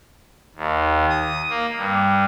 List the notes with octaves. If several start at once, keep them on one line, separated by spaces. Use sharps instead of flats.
D#2
D#6
A#3
G2